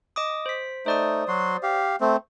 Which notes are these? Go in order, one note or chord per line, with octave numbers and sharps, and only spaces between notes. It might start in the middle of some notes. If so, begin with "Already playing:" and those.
D#5 D6 D#6
C5 B6
A3 D#4 C5 D5 D#6
F#3 F#4 C6
G4 F5
A3 C4